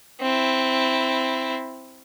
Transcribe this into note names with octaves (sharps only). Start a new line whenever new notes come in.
C4 E4